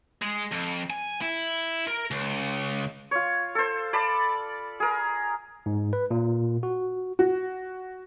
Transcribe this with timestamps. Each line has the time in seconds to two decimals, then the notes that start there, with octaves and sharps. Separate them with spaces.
0.22 G#3
0.52 F2
0.90 G#5
1.21 E4
1.88 A#4
2.11 C#2
3.11 F4 C#5
3.55 A4 C5
3.93 D5 A5 B5
4.80 G#4 A#4
5.66 G#2
5.93 B4
6.11 A#2
6.63 F#4
7.19 F#4